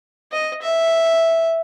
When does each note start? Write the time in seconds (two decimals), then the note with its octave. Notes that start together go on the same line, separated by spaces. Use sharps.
0.32 D#5
0.62 E5